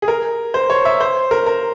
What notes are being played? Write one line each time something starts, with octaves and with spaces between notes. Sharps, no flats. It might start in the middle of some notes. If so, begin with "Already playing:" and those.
G#4
A#4
C5
C#5
E5
C5
A#4
A#4